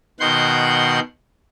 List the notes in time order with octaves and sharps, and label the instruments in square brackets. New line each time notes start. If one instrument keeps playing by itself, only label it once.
[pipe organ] B2 D#3 F#5 C6 G6